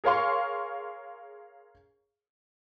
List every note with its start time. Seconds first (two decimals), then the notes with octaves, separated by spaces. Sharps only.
0.04 G#4 A#4 C#5 F5 C6 C#6